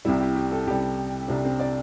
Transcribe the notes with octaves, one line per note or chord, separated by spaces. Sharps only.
C2 C3 G3 E4
G4
G4
A4
C2 C3 G3 G4
C2 C3 G3 D4
C4
D5